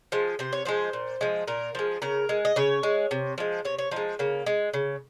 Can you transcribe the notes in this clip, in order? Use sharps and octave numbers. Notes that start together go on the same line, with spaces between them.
F3 G#3
C3 C5
C#5
F3 G#3 C5
A#2
F3 G#3
A#2 A#4
F3 G#3
C#3 A#4
G#3
D#5
C#3 C#5
G#3
C3
F3 G#3
C3 C#5
C#5
F3 G#3 D#4
C#3 A#3
G#3
C#3